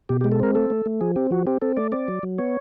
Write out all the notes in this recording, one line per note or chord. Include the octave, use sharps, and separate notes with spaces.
B2 G4
G4
G#3
A4
C4 A#4
A3 A4
A3
A3
F3 G#4
C4 G4
F3 F#4
C4 G4
C4 A4
A3 D5
C4 D5
F#3
F#3
B3 C#5